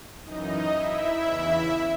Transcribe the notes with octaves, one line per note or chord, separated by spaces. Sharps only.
F#2 E3 D#4 D#5
E4 E5
E2 C#3 E3